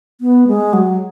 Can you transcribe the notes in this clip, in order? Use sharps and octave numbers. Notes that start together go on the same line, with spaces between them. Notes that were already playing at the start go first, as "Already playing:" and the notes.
B3
G#3
F#3